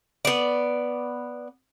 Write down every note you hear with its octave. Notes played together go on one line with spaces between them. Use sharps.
B3 D5